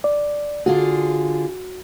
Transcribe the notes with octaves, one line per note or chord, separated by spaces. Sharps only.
D5
D3 F4 F#4 G#4